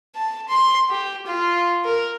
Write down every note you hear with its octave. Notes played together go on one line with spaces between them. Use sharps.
A5
C6
G4
F4
A#4